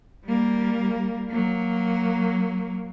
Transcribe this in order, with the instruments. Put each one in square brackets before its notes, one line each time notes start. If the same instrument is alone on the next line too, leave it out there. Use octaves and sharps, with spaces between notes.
[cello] G3 A#3
F#3 A#3